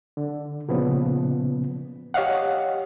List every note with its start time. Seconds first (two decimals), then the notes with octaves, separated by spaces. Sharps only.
0.17 D3
0.68 A#2 C#3 F3 B3
2.14 G4 C#5 D#5 F5 F#5